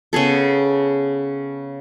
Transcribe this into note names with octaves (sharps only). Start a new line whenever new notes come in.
C#3 B3 G#4 A4